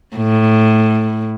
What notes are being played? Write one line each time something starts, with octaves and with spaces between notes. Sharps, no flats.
A2